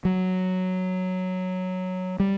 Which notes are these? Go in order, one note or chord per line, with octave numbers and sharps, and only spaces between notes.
F#3
G3